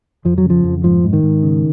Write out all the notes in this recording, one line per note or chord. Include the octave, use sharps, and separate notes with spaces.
F2 F3
F#3
C#3
F3
F2
G#2 F3
G#2
D#3
G#2
C#3